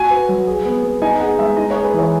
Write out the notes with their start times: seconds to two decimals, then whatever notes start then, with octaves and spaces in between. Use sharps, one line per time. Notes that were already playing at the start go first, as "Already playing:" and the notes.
Already playing: F#4 G#5
0.10 B4
0.29 F#3
0.47 G#4
0.65 B3
0.83 B3
1.02 D#4 G#5
1.20 G#4 F#5
1.39 G#3 E5
1.57 D#4 D#5
1.71 C#5
1.75 G#4
1.84 B4
1.94 E3 C#5